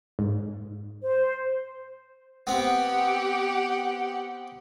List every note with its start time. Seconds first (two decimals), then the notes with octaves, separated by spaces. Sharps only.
0.19 G#2
1.02 C5
2.47 B3 C4 G4 F#5